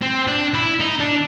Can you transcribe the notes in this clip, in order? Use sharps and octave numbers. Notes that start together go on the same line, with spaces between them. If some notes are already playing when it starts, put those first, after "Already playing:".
C4
D4
E4
D#4
D4